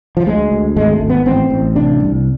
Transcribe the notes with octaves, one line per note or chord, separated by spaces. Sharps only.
F3
D2 G#3
D2
G#1 G#3
A3
G#1
B3
A1 C4
A1
C3 D4
C2